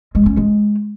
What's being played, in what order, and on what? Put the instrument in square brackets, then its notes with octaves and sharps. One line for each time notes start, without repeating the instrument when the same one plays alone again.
[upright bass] G#3
C#4
G#3